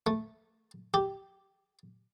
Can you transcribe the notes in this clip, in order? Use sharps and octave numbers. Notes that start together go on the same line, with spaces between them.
A3
G4